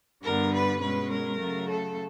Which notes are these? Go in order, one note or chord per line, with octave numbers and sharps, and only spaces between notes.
G2 D3 G3 B3 A#4
B4
B2 G#3 C#4 B4
A#4
C#3 F#3 A3
A4